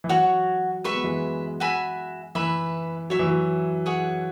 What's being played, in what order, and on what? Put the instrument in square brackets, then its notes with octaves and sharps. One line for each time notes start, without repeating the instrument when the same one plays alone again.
[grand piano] E3
[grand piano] F#3 [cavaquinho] F#4 C#5 F#5 C#6
[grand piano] G#3 [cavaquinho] B4 E5 C#6
[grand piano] B3
E3 G#3
[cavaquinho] F#4 E5 G#5 B5
[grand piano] E3 [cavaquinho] B4 E5 B5
[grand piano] F#3 [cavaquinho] C#5 E5 C#6
[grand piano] E3
F#3
[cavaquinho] G#4 C#5 F#5